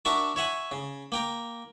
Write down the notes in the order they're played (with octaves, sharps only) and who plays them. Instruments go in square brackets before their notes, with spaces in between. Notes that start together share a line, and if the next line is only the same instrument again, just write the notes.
[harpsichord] D4 F#4 A#4 E5 A5 C#6
C#5 E5 F#5 G#5
C#3
A#3 G5 A#5